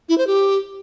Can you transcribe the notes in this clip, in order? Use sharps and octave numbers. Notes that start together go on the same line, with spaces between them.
E4
C5
G4